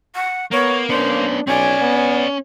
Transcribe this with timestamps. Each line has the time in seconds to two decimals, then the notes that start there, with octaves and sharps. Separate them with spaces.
0.15 F#5
0.52 A#3 B3 C#5
0.89 B3 C#4 D4 C5
1.48 B1 C4 C#4 D5 G#5
1.81 B3